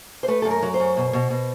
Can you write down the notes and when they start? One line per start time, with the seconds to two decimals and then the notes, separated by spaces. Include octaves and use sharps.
0.23 C5
0.28 A3 B4
0.42 F#2 A4
0.51 A#4
0.62 F#3
0.74 C5
0.80 F#2
0.97 B2
1.13 B2
1.30 B2